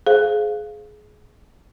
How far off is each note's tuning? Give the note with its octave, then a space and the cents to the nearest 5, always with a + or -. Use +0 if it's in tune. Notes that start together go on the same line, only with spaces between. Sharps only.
G#4 +20 C5 +0 F5 -5